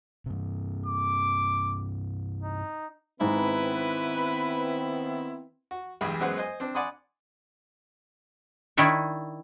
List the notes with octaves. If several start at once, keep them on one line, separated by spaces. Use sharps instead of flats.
G2 C3
D6
D#4
G#2 D#3 B3 C4 E4 B4
F#4
B1 E2 G2 G#3 B5
F#2 F#3 G#3 B3 C5 F#5
C5 D#5 G#5
C4 D4
D5 F#5 G#5 B5 C6 D#6
D#3 D4 E4 C#5